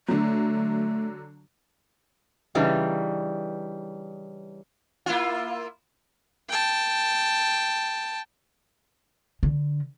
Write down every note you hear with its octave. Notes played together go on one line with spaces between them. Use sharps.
D3 F#3 A3
C#3 E3 G3 D4 D#4
A#3 E4 F4
G5 A5
D3